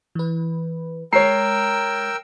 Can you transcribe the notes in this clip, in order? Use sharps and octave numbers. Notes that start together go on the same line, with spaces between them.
E3 B4
G#3 A#4 C#5 G5 A#5 E6 C7